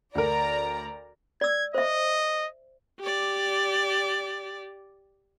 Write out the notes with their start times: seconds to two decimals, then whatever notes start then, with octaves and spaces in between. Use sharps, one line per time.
0.15 D2 A#4 D5 A#5
1.41 D5 E6 G#6
1.75 C5 D#5 E5
3.00 G4 D5